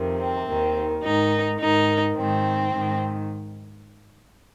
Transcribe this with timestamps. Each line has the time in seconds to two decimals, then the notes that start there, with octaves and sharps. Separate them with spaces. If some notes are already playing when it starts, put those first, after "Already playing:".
Already playing: F2 C3 D#3
0.19 C4
0.47 D#2 D#3
1.03 G#2 D#3 D#4
1.60 G#2 D#3 D#4
2.16 G#2 D#3 C4
2.73 G#2 D#3